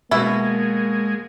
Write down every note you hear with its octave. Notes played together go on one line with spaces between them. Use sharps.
B2 G#3 A#3 E4